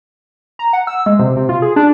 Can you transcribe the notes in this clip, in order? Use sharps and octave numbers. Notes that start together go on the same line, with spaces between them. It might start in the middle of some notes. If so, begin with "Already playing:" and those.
A#5
F#5
E6
G#3
C3
C3
F4
G#4
D4